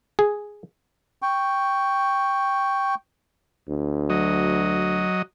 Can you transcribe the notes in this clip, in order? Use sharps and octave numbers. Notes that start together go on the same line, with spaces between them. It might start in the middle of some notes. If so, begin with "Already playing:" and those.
G#4
G5 C#6
D2
F#3 D#5